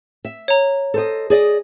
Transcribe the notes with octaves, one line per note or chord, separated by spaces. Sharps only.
E5
C#5 A#5
A4 C5 D#5
G#4 D5 D#5